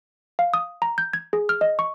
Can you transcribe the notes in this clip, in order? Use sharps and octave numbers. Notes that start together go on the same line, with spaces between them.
F5
D#6
A#5
G6
G#6
G#4
F6
D#5
C#6